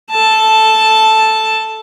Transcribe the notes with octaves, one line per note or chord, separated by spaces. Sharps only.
A4 A5